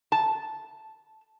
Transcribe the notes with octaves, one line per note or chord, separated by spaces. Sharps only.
A5